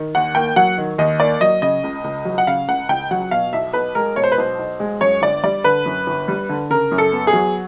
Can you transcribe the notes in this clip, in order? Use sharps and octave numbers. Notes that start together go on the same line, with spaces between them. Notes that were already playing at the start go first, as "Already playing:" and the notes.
Already playing: D#3
D#2 F#5
A#3 G5
F#3 F#5
D#3
D#2 D#5
A#3 D5
F#3 D#5
C#3 D#5
C#2
C#2
F#3
F#5
C#3 F5
C#2 F#5
C#2 G5
F#3 F#5
B2 F5
B1 E5
B1 B4
G#3 A#4
B2 C#5
C5
B4
B1 C5
B1
G#3
F#2 C#5
G1 D5
G3 D5
D3 B4
F#2
G1
G3
D3
C#3 A#4
F#2
A4
B3
G#4
F#3